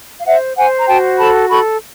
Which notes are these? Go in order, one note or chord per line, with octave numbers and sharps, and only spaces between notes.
F5
C5 E5 F#5
C5 F#5 G#5
A#5
F#4 G5 A5
A4 A5 B5
A4 B5 C#6